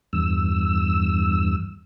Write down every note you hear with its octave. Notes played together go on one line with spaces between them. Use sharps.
E2 G2 E6